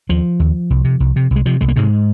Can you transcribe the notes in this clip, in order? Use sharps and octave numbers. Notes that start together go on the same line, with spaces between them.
D#2 F3
D#2
C2
C3
C2
C3
C2 G#3
C3 F3
C2 G#3
A#3
G#2 C3 G#3